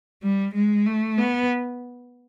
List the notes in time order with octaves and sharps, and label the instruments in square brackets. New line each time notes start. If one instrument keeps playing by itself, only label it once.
[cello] G3
G#3
A3
B3